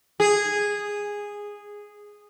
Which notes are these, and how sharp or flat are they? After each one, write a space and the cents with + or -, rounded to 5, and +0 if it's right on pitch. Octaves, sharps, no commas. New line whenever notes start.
G#4 -10